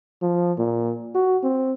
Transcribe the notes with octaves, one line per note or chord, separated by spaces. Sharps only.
F3
A#2
F#4
C4